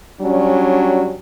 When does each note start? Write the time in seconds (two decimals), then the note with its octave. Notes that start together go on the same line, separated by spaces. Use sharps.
0.20 F#3 G3 C#4 D4